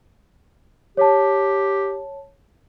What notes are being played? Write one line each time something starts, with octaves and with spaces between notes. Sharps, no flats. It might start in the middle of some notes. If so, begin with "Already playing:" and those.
G4 C#5 A5